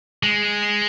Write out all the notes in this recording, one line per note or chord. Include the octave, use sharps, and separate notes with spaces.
G#3